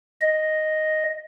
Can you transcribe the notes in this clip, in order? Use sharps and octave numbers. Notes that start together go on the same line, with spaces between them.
D#5